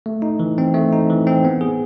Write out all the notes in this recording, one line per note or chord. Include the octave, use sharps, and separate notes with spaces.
A3
D#4
E3
C4
A3
D#4
E3
C4
B3
G#4